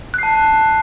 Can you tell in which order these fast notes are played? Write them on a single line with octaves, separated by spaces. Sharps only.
F#6 C7 A5